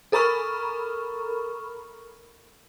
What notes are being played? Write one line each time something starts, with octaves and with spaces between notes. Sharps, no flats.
A4 A#4 A#5 B5 C#6 F6